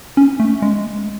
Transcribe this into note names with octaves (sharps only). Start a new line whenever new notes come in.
C#4
A3
G#3